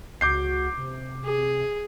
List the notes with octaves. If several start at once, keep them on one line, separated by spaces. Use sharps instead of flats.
C#2 F#4 D6 G6 C7
C3
G#4